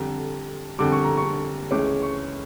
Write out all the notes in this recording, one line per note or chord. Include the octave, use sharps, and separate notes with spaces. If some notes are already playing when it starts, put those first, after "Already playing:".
Already playing: F2 D3 G3 A#5
F2 D3 G3 D6
C#6
A#5
C#6
C#2 C#3 E3 A3 C#4 D6
C#6